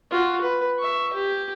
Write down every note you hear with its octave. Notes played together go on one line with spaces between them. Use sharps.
F4 F#4
B4
E5 C#6
G4